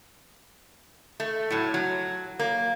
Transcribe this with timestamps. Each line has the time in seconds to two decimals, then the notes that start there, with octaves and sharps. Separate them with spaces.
1.20 A3
1.50 A2 F#3
1.74 F#3
2.39 A#3